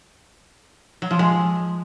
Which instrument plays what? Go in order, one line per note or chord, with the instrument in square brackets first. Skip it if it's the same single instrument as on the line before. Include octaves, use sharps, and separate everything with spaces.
[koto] F#3
F3
G#3